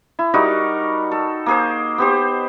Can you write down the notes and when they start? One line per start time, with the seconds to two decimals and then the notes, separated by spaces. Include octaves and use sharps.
0.19 E4
0.34 G3 D#4 F#4 A#4
1.11 A4
1.46 A#3 G#4 C5
1.98 B3 G4 C5